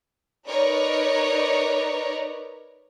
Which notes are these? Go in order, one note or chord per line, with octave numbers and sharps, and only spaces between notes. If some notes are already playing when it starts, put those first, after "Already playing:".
D#4 A#4 B4 C#5 D5 A#5